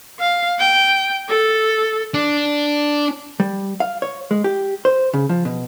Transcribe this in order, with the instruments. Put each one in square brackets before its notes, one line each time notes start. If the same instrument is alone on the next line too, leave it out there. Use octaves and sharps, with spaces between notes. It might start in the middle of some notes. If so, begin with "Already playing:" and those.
[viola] F5
G5
A4
[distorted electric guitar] D4
[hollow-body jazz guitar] G3
F5
C#5
G#3
G4
C5
C#3
F3
B2